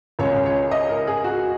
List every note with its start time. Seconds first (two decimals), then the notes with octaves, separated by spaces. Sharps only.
0.19 C#2 C#3 G#3 C#4 C#5
0.46 C#5
0.71 D#5
0.89 A#4
1.07 G#4
1.24 F#4